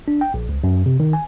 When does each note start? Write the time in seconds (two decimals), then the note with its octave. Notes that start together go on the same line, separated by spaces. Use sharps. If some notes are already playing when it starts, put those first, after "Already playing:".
0.08 D4
0.21 G5
0.34 A#1
0.49 C#2
0.64 F#2
0.86 C3
1.00 D#3
1.13 G#5